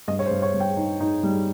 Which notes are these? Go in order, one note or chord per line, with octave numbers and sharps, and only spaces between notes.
G2 D#5
C#5
C5
G2
C#5
G2
G5
D#4
D#4
G3